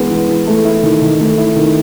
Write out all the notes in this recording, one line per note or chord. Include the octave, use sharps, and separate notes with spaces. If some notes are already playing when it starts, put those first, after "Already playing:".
Already playing: E3 G#3 B3
E3
E3
A3
E4
D#3
D#3
A3
E4
D#3